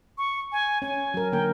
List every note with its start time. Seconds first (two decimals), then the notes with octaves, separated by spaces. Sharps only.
0.18 C#6
0.52 G#5
0.82 C#4 G#5
1.14 F#3 A#4
1.32 D3 A#3 A#4 G5